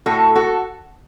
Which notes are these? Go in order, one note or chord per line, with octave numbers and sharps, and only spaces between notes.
A2 F#4 A4
F#4 A4